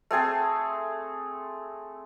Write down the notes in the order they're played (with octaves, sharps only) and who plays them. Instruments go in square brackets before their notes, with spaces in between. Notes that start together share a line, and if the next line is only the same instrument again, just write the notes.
[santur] A3 C4 G#4 A4